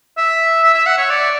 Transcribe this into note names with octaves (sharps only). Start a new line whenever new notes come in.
E5
E5
E5
F#5
C#5
D5